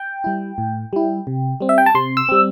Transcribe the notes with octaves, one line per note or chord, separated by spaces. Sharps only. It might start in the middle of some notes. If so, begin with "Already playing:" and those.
Already playing: G5
G3 E4
A2
G3 E4
C3
G3 C4
E5
G5
A5
C3 C6
E6
G3 C4